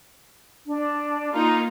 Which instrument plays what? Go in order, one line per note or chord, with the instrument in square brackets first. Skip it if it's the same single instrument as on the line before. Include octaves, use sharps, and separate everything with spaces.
[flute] D4
[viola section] A#3 D#4 F4 [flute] A#5